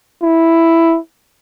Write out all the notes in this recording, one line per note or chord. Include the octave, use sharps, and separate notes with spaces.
E4